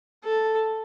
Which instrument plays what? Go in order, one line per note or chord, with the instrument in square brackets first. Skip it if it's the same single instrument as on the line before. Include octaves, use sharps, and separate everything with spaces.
[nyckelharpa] A4